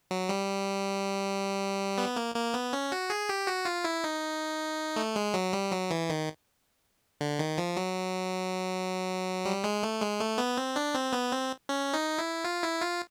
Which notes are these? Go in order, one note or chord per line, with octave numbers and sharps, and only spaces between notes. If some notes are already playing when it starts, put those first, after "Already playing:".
F#3
G3
B3
A#3
A#3
B3
C#4
F#4
G#4
G4
F#4
F4
E4
D#4
A3
G#3
F#3
G3
F#3
E3
D#3
D3
D#3
F3
F#3
G3
G#3
A3
G#3
A3
B3
C4
D4
C4
B3
C4
C#4
D#4
E4
F4
E4
F4